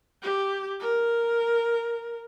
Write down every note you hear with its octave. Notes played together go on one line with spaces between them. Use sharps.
G4
A#4